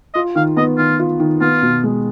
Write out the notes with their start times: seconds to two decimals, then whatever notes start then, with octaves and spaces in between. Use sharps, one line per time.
0.14 F4 D#5
0.35 D#3 F5
0.57 B3 D#5
0.78 D#3 F4
0.99 F4
1.20 D#3
1.41 B3 F4
1.62 B2
1.84 G#3